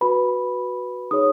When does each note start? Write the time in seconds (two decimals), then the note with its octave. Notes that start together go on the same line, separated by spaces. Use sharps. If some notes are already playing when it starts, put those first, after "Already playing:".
0.01 F#4 B4 B5
1.11 D#4 G#4 C#5 D#6